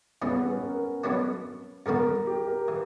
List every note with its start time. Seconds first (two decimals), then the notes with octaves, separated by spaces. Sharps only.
0.22 E2 C#3 E3 G3 C#4
0.31 B3
0.42 C#4
0.52 B4
0.63 A#4
1.04 B2 F#3 B3 D4 F#4
1.86 F#2 D3 G3 B3 F#4 A#4
2.27 G4
2.48 A#4
2.68 E3